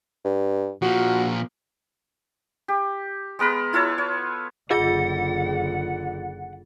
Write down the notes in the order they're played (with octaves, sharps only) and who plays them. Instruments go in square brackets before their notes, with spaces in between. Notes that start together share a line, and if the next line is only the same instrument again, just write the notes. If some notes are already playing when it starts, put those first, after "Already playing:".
[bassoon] G2
[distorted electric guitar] A#2 F3 [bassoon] F#4
[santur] G4
G#3 B3 A#4 B4
E4 F4 A4 C#5
C#5
[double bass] F#1 D3 [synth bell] F4 G#4 A6 [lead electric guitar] F#5